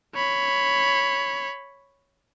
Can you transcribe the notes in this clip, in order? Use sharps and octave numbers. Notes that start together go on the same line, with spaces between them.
C#5 B5